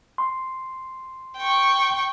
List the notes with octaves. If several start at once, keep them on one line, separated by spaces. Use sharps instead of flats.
C6
G5 C#6